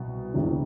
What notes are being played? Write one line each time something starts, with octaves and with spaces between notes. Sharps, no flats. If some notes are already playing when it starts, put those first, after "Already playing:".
Already playing: C2 B2
E1 D2 C3 E3